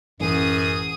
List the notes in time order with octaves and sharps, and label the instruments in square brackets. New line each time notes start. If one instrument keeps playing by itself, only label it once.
[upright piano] A1 [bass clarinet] F#2 [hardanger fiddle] G#4 D#6